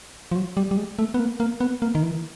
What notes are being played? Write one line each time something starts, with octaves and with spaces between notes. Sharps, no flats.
F3
F#3
G3
G3
G#3
A3
B3
A#3
A#3
B3
A#3
D#3
E3